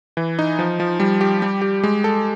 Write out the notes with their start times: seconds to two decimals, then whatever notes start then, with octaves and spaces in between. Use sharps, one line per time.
0.17 E3
0.39 D#4
0.59 F3
0.80 F3
1.00 G3
1.21 G4
1.42 G3
1.62 G4
1.83 G#3
2.04 A4